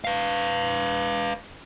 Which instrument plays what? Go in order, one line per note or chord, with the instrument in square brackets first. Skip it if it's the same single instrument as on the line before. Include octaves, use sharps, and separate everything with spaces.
[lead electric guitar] B4 F5